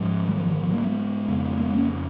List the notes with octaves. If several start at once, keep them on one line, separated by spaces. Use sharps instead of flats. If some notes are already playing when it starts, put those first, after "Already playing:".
Already playing: G#2 F3 G#3
D#3 F#3
F3
D#3
F3
F#3 A#3
G#3 B3
F2 C#3 G#3 B3
A#3
G#3 B3
A#3 C#4